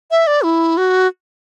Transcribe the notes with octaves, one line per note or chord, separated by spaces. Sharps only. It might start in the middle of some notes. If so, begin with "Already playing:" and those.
E5
D5
E4
F#4